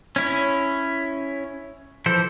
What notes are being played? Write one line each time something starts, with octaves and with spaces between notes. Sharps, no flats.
C#4 E4 C#5
E3 F3 A4 C5